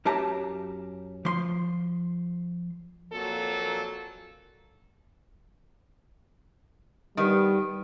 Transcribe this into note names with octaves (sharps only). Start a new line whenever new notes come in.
F#2 C#4 G4 E5 A5 A#5
F3 C6
F2 A#2 F#3 A#3 A4
D#3 G3 B3